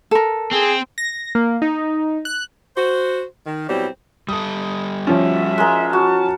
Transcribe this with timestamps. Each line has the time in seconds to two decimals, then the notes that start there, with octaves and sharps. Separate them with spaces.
0.11 A4 A#4
0.53 C4 G#4
0.98 A#6
1.35 A#3
1.62 D#4
2.25 F#6
2.77 F#4 C5
3.46 D#3
3.68 B2 F#3 G3 C4 E4
4.29 G3 A4 D#6
5.07 F3 C#4 F#4 E5
5.58 G#3 A#4
5.93 F#4 A5